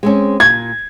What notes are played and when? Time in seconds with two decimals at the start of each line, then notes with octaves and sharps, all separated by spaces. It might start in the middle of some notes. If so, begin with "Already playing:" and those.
0.03 G#3 C4 C#4
0.40 A#2 G#6